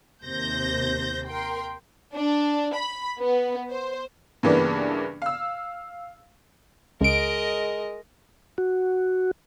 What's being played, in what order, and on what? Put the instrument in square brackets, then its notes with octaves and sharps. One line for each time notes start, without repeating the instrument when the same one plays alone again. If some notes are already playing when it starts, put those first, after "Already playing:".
[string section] D#2 C3 C5 G6 A#6
A#4 G5 C6
[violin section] D4
B5
B3
C5
[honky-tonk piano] G2 C#3 E3 A#3 B3 D4
F5 E6
[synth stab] C#2 D7 [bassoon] G#3 [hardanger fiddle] A#4 D#5
[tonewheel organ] F#4